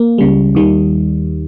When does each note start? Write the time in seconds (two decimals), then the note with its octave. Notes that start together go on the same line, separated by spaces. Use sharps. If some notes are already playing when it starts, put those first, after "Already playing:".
Already playing: A#3
0.18 C#2 C#3 G3
0.55 D#2 D#3 G3